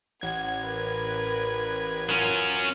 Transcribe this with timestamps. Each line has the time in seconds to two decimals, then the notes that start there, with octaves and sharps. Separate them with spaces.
0.21 A1 F#5 G#6
0.64 A#4 B4
2.09 F#3 C#4 F4 A#4